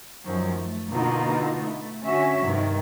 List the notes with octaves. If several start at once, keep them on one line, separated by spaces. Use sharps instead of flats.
F#2 D#3 F3 F#3
A3
B2 D3 A#3 B3 D#4 F4
A3
D3 C#4 F#4 E5
G2 C3 D#3